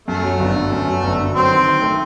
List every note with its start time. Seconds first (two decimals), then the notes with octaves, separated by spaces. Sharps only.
0.08 F#2 A3
0.23 F#3
0.40 G1
0.55 D3
0.72 F#2
0.88 F#3
1.03 G1
1.20 D3
1.35 F#3 C4
1.51 D#3
1.67 D#3
1.82 A3